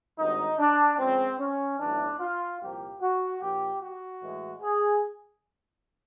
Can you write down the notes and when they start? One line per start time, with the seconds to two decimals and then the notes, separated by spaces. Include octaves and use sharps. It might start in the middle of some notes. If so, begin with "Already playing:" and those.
0.18 G#1 G2 D3 D#4
0.59 D4
0.99 C#2 C#3 F3 C4
1.39 C#4
1.80 B1 A2 E3 D4
2.20 F4
2.61 C2 A#2 F3 A#3 G4
3.01 F#4
3.41 A#1 A#2 F3 G4
3.81 F#4
4.22 A2 E3 G#3
4.62 G#4